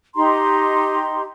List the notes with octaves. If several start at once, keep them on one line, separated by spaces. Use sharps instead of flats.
D#4 G4 A#5 C6